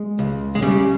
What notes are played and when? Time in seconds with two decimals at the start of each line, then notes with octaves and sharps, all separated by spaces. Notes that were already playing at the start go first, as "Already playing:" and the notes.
Already playing: G#3
0.19 C#2
0.55 G#3
0.62 C#3 G3